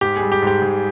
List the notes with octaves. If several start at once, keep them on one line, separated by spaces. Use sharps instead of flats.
G#2 G4
G#4
G3
G4
G#2 G4
G#2